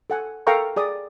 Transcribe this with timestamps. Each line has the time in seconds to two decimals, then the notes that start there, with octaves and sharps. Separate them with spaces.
0.10 A4 F#5 G#5
0.47 A4 A#4 F5 G5 A#5 C#6
0.76 G#4 D5 D#6